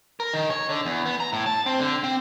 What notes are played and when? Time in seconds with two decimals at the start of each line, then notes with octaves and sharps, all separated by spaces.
0.20 A#4
0.34 D#3
0.50 C#5
0.69 D3
0.85 E2
1.05 B3
1.20 A#5
1.33 A2
1.46 A5
1.66 C4
1.79 D3
2.04 C4